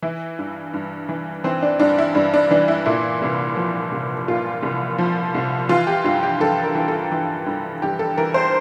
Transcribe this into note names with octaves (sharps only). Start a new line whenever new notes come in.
E3 E4
G2
G2
E3
E3 C4
D4
G2 D4
E4
G2 D4
D4
E3 D4
E4
A#2 E4
C2
F3
C2
A#2 F4
C2
F3
C2
E3 F4
G4
G2 F4
G4
G2 A4
A#4
E3
A4
E3
G2
G2 G4
A4
E3 A#4
C5